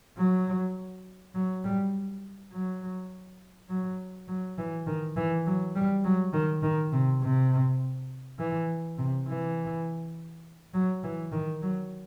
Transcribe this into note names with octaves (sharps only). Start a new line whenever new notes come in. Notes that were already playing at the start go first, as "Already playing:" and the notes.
F#3
F#3
G3
F#3
F#3
F#3
E3
D#3
E3
F#3
G3
F#3
D#3
D#3
C3
C3
E3
C3
E3
F#3
E3
D#3
F#3